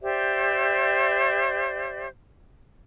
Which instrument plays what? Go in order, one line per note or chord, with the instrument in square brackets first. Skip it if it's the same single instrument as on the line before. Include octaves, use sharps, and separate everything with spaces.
[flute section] G4 C5 D5 E5